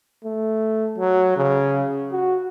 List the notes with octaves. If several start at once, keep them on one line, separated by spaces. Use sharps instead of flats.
A3
F#3
C#3
F#4